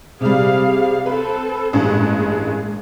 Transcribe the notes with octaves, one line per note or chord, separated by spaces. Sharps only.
C3 G3 G#4 F5
C4 A4 B4
A1 G2 G#3 A#3 G#4